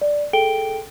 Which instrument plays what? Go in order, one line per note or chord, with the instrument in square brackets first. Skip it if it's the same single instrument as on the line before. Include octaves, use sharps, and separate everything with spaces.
[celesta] D5
G#4 A4 G5 D7 G7